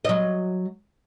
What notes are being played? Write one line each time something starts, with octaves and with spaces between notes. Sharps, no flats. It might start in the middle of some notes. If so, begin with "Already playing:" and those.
F#3 D#5